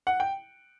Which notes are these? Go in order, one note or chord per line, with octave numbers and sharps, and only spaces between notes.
F#5
G5